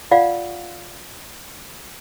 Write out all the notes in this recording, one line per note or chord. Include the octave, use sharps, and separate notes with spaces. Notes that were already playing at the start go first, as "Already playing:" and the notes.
F4 D5 F5 F#5